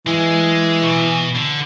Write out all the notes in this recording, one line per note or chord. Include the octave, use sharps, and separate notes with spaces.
E3 G#3
B2
D3